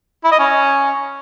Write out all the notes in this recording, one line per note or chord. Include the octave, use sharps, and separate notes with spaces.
E4
D#5
C#4